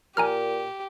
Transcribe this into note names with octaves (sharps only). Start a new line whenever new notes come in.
A#2 G4 G#5 A#5 F6